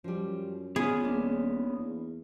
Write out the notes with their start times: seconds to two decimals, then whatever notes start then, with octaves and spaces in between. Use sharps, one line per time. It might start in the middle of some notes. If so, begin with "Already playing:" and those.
0.04 F#2 F3 G3
0.76 B3 C#4 F4 G#4
1.04 D#1 A#3 D4 D#4
1.79 E2